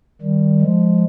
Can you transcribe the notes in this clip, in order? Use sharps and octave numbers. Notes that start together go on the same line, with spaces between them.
D#3 G3
F3 G#3